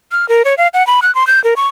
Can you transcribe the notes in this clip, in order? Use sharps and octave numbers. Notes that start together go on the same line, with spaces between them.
F6
A#4
C#5
F5
F#5
B5
F#6
C6
G6
A#4
C#6